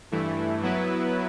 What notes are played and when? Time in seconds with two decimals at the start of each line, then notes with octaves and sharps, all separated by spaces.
0.12 G2 E3 A3 E4
0.62 F#3 B3 E4 B4